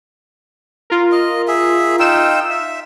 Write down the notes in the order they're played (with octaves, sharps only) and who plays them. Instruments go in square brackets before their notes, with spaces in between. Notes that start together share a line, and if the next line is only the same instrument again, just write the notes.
[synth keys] F4 A#4
[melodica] D#5
G#4 E5
[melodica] D#4 F4 G5 [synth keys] E6 E7
[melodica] E5